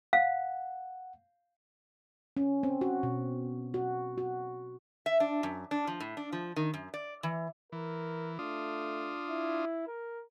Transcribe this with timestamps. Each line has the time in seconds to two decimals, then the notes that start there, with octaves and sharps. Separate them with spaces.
0.13 F5 F#5
2.37 C#4
2.63 C4
2.81 F#4
3.03 B2
3.74 F#4
4.18 F#4
5.06 E5
5.20 D4
5.43 F#2
5.71 D4
5.87 F3
6.00 A2
6.17 D4
6.33 F3
6.56 D#3
6.74 F#2
6.94 D5
7.23 E3
7.72 E3 A#4
8.39 A3 D4 F4 D#6
9.29 E4
9.88 A#4